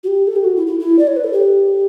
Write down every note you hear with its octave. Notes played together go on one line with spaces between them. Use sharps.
F#4
G4
A4
G4
F#4
E4
E4
E4
D5
C#5
B4
A4
G4